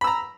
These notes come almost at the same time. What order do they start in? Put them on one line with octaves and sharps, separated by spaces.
B5 E6 A#5